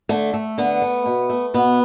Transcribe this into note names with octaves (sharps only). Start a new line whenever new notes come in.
D3 A3
A3
D3 B3
A3
B2
A3
B2 B3